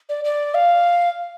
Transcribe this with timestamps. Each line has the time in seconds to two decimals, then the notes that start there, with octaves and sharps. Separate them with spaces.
0.09 D5
0.24 D5
0.54 F5